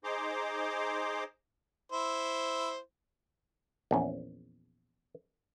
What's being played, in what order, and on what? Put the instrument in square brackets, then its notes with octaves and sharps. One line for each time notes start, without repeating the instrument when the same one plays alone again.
[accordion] D#4 G#4 C5 A#5 C6 D6
[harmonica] E4 C5
[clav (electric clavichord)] A#1 E2 C#4